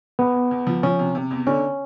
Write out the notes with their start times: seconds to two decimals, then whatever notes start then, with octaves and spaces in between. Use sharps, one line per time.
0.19 E2 B3
0.34 E2
0.51 E2
0.67 F3
0.83 F3 C#4
0.99 C3
1.15 C3
1.31 E2
1.46 D3 C#4